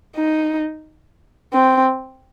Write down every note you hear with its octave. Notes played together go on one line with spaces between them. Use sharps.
D#4
C4